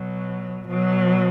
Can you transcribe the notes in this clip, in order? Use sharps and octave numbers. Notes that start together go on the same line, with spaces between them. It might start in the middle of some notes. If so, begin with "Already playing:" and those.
Already playing: B2 F#3
B2 F#3